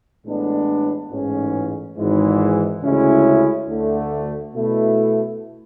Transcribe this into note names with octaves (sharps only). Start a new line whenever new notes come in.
A1 A2 G#3 B3 D4
A1 G#2 G#3 C#4
G#1 G#2 E3 G#3
D2 C#3 G#3 C#4 E4
D2 D3 A3
B2 A3 E4